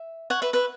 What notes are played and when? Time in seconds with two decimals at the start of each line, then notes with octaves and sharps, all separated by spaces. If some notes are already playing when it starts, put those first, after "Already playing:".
Already playing: E5
0.30 C#5 F#5
0.42 B4 E5
0.53 B4 E5